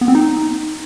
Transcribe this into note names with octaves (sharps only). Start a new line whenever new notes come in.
B3
C4
D#4